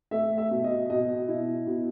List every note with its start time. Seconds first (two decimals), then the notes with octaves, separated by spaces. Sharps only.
0.11 A3 E5
0.38 E5
0.51 B2
0.64 D#5
0.90 B2 D#5
1.28 E4
1.67 B2